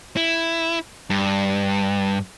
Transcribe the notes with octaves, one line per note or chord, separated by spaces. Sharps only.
E4
G2